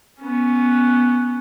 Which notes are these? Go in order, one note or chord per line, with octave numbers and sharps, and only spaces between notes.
B3 C#4